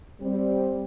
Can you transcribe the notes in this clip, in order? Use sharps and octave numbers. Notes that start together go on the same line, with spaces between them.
G3 C4